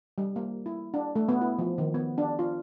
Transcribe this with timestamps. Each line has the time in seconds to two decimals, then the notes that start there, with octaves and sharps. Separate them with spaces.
0.18 G3
0.36 A#3
0.66 E4
0.94 D4
1.16 A3
1.29 B3
1.41 E4
1.59 F3
1.78 D#3
1.94 B3
2.18 D4
2.39 F4